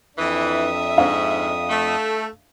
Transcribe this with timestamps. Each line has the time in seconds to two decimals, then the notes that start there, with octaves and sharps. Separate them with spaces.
0.18 F2 E3 D4 E5 D#6
0.98 G#2 F5
1.69 A3